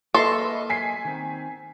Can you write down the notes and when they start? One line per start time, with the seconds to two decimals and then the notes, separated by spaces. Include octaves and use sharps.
0.14 A#3 A4 B4 D#5 E5 C6
0.69 G#5 B6 C7
1.05 D#3 C4